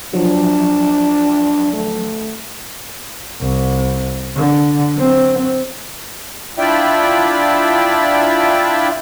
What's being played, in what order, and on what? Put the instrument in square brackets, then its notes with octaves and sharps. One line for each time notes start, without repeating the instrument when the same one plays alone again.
[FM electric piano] F3 F#3 [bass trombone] D4
[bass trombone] A3
[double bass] C2
D3
F#3 C4
[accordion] D4 E4 F4 D5 E5 G5